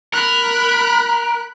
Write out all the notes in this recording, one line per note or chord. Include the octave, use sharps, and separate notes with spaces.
A#4 B5 F#6